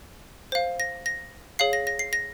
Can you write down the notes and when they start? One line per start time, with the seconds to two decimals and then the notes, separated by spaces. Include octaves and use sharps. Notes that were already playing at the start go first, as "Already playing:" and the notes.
0.52 C5 F5
0.80 A#6
1.06 A#6
1.59 G#4 C#5 F5 C7
1.73 A#6
1.87 A#6
1.99 C7
2.13 A#6